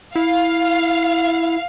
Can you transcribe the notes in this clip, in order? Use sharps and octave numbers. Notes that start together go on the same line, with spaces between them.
E4 F5